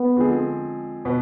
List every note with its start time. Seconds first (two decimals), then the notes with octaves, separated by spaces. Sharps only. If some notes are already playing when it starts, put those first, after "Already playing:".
Already playing: B3
0.17 D3 F3 G#3 C4 G#4
1.05 B2 B3